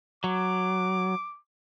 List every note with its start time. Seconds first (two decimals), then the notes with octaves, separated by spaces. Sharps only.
0.24 F#3 D6